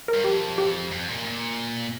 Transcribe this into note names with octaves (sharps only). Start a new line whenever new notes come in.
A#4
G2
F2 G4
G4
F2
A#2
A#2